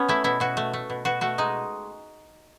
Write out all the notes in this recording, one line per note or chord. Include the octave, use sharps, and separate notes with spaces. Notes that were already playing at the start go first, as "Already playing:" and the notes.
Already playing: B3 C#4
A3 E4
B2 E4
B2 F#4
A3
A3
B2
B2 F#4
A3 F#4
G#3 D#4